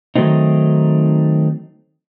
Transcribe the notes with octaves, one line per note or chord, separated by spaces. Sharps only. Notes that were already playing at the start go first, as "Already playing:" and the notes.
D#3 F#3 A3 C4 D#4